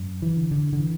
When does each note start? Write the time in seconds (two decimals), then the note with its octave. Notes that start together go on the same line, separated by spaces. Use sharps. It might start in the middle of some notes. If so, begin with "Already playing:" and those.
Already playing: F#2
0.22 E3
0.37 D3
0.51 D3
0.73 D3
0.80 E3